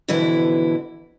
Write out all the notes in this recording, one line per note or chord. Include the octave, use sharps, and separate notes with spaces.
F2 B2 D3 E3 E4